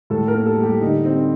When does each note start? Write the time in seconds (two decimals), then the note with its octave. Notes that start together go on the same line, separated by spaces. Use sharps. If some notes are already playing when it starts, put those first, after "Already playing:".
0.10 A2 A4
0.28 A#4
0.34 A#3
0.46 A4
0.58 G3
0.63 G4
0.81 D3 D#4
1.05 C4